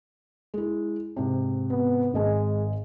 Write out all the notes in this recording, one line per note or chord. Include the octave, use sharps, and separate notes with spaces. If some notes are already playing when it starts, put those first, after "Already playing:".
G#3 E4
G#2 C3
B3
G#1 G#3 D#5 G#5